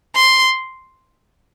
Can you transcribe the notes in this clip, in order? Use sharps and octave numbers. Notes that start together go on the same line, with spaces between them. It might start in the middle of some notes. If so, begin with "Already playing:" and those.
C6